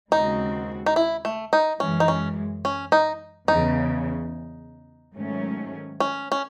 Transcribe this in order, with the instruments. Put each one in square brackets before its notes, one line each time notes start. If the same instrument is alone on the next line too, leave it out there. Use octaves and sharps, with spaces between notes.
[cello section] D#2 C#3 G#3 C4 F#4 [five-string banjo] D#4
[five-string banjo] D#4
E4
A3
D#4
[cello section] F#2 E3 G#3 [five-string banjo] C#4
[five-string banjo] D#4
C#4
C#4
D#4
[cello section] E2 C#3 E3 [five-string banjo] D#4
[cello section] G#2 D#3 F#3 A3 C#4
[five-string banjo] C#4
C#4